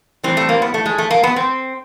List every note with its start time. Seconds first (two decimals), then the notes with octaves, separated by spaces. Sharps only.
0.24 A2 E3 G3 C4
0.37 A3
0.49 A#3
0.62 B3
0.74 A3
0.86 G#3
0.98 A3
1.11 A#3
1.23 B3
1.36 C4